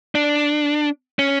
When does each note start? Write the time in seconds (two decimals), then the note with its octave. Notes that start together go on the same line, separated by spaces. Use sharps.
0.15 D4
1.19 C#4